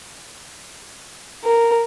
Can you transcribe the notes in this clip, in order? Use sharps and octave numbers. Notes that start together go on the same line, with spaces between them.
A#4